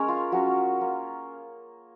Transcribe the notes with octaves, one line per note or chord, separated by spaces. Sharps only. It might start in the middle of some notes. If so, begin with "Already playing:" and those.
Already playing: G#3 C#4 A#4 C#5
F4
F#3 C#4 F4 F#4
A#3 F4